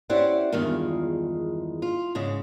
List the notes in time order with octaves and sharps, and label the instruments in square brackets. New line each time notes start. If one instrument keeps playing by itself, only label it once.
[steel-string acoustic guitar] C#4 E4 G4 C5 D5 F#5
E2 G2 D#3 G#3 F4
F4
G#2 C#3 G#3